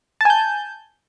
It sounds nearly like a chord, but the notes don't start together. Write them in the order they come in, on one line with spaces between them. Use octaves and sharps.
A5 G#5 G6